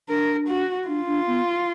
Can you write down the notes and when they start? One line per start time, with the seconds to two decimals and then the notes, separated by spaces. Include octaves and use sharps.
0.08 D4 A#4
0.48 F#4
0.87 D4 F4
1.07 D4
1.27 B3